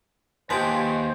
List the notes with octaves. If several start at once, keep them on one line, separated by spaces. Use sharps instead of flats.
D#2 F3 G#3 G4 G#4 B4 C5